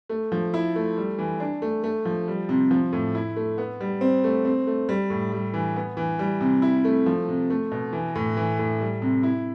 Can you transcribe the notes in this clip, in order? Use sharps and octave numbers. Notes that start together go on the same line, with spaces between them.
A3
F3
E4
A3
G3
E3
D4
A3
A3
F3
G3
C3
F3
A2
E4
A3
B3
G3
C4
A3
C4
A3
G3
A2
G3
E3
B3
E3
G3
C3
E4
A3
F3
C3
A3
B2
E3
A2
E3
A2
G3
C3
E4